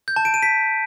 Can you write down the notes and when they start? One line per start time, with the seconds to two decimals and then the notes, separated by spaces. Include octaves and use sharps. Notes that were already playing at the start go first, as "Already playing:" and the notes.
0.08 G6
0.16 A5
0.25 D7
0.34 D#7
0.43 B6